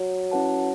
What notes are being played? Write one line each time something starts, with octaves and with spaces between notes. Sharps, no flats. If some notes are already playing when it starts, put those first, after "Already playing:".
Already playing: F#3
C#4 E4 B4 F#5 A5